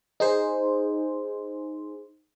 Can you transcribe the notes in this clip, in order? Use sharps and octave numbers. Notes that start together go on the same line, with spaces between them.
D#4 G#4 C5